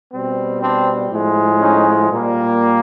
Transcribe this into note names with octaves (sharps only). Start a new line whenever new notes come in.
B2 G3 C4
C4 D4
A2 F3 G#3
C#4 D#4
A#2 G3 A#3